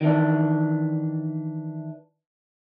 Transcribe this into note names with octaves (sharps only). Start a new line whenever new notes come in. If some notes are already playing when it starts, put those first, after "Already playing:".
D#3 E3 D4